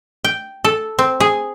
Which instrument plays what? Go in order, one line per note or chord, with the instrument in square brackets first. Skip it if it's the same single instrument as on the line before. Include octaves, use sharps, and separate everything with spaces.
[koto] G5
A4
C4
G#4